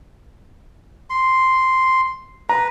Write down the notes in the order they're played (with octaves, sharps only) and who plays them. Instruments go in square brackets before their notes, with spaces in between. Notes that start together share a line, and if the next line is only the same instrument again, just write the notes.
[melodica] C6
[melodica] B4 [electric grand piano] A#5